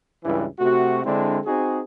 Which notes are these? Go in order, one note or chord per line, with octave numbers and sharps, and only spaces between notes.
C#2 G2 E3
C3 A3 F#4
D3 G#3 C4 D4 E4
C4 D#4 F#4 G#4